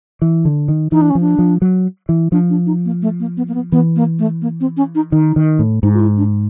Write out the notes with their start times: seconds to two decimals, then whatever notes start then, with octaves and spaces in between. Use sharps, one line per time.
0.22 E3
0.45 D3
0.68 D#3
0.92 E3 D#4
1.02 D4
1.10 C#4
1.15 F3
1.20 D4
1.39 F3
1.62 F#3
2.09 E3
2.32 F3 D4
2.50 D4
2.66 D#4
2.85 A#3
3.02 A3
3.20 A#3
3.37 B3
3.48 A#3
3.54 B3
3.72 E3 B3
3.96 A#3
4.19 A3
4.42 A#3
4.61 C4
4.77 C#4
4.95 D#4
5.12 D#3 D#4
5.36 D#3
5.59 A2
5.83 G#2 D#4
5.94 F4
6.00 E4
6.17 D4